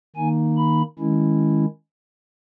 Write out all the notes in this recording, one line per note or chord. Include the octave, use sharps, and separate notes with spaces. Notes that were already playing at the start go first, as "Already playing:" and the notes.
D#3 A#3 D#4 G#5
B5
D#3 G#3 C#4 E4